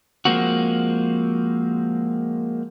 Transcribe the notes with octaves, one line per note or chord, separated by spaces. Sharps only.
F3 G#3 A#3 C4 F#4